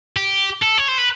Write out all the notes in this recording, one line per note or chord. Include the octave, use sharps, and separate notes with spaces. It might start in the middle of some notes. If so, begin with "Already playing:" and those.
G4
A4
C#5
C5
B4